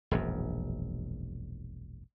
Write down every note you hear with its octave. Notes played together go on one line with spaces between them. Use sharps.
E1 A#1 F#2